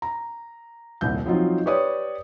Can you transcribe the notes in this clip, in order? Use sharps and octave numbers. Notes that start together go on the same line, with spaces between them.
A#5
D#1 C2 G6
F3 F#3 C4 D#4 F4
G4 B4 C#5 D5 D#6